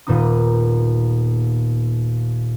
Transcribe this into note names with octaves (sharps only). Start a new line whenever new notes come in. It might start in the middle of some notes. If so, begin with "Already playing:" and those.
D#1 A#2 B3 D#4 D#6